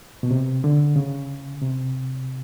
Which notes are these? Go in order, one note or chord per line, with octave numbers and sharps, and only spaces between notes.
B2
C3
D3
C#3
C3